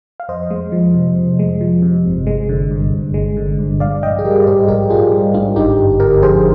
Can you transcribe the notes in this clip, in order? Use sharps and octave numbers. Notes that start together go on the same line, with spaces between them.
F5
F2 C5 D#5
G#3
F3
C3
F2
G#3
F3
C3
G1
G#3
D3
G2
G1
G#3
D3
G2
A#1 D5 F5
A#1 D#5 G5
G#4
G3 G4 A#4
D5
G#2 G#4 C5
A#1 G4 A#4
A#1 F4 G#4
G3
G#2 D4 F4
G1 D#4 G4
G1
D3 G4 A#4
F2 G#4 C5